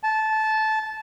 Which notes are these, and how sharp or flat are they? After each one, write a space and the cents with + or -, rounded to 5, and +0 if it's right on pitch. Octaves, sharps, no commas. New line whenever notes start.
A5 -15